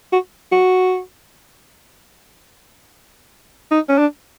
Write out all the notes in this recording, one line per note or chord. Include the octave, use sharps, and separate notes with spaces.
F#4
F#4
D#4
C#4
D4